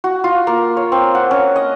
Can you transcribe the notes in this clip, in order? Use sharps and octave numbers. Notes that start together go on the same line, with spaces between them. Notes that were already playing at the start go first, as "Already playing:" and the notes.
F#4
F4
A#3
C#5
C4
F#5
C#4
D#5